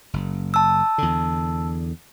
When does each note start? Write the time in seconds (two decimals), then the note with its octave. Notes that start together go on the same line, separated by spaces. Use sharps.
0.13 F#1
0.54 A5 E6
0.98 E2 D3